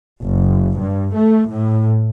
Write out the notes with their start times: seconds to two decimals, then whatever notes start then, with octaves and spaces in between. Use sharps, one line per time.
0.23 F#1
0.80 G2
1.16 A3
1.51 A2